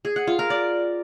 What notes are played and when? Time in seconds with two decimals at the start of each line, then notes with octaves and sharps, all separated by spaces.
0.05 G#4
0.16 F#5
0.27 F4
0.39 A#4
0.50 D5